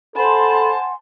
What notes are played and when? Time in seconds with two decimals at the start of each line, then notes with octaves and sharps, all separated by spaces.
0.16 A4 C5 F#5 G#5 A5 B5 C6